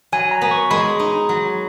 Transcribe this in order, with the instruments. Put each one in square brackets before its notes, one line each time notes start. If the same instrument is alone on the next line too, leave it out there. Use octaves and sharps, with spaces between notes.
[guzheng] F#3 [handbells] G#5
[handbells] A#5
[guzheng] B3
[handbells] C#6
[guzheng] G#3 [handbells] B5
[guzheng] D#4
F#3